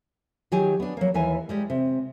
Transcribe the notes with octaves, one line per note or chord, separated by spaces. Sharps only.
D#3 F#3 G4 G#4 G#5
B3 D4
F#3 A#3
D#2 E3 A#4 G#5
G3 G#3 G4
C3